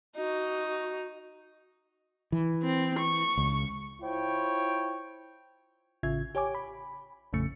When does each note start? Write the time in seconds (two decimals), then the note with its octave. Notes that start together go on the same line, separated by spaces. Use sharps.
0.17 D#4 F#4
2.32 E3
2.63 C4
2.99 C#6
3.37 C#2
4.02 E4 F4 C5 C#5 G5
6.03 A1 C#3 F4 E5 G#6
6.35 G4 C#5 G#5 D6
6.55 B5
7.33 A1 F2 C#3 A3 C#7